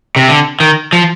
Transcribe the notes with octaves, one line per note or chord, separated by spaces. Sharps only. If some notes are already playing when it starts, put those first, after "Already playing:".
C3
D3
D#3
F3